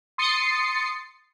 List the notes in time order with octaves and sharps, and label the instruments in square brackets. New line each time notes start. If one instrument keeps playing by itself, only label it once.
[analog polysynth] C6 D#6 A6 C7 C#7